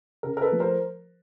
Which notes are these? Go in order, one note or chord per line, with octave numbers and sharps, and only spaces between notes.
C#3 A#4
A#4
A4 B4
F3 A3
A#4 C5